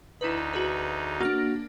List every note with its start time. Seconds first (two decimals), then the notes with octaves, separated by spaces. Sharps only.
0.21 D2 D#4 E4 B4
0.53 F#4 G#4 B4
1.20 A#3 D4 F#4 F6